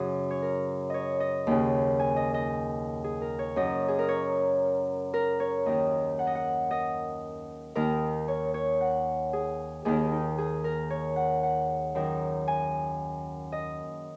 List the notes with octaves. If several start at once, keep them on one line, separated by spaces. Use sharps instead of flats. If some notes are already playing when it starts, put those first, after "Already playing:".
Already playing: F#2 C#3 F#4 G#4
C#5
A#4
C#5 D#5
D#5
D#2 C#3
G#5
D#5
D#5
G#4
A#4
C#5
F#2 C#3 D#5
G#4
A#4
C#5
A#4
C#5
D#2 D#3 D#5
F#5
D#5
F#5
D#5
D#2 D#3 A#4
C#5
C#5
F#5
G#4
D#2 D#3 G#4
D#4
G#4
A#4
C#5
F#5
F#5
F#2 D#3
G#5
D#5